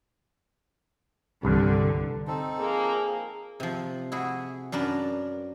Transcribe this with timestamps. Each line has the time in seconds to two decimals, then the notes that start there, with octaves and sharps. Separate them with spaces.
1.43 C2 G2 D3
2.27 C4 D#4 A4
2.59 F3 A#3 G#4
3.60 C3 F3
4.12 E4 F#4 G#4
4.72 F#2 D4 A#4 B4 A5